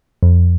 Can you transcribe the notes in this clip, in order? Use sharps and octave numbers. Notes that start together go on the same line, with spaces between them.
F2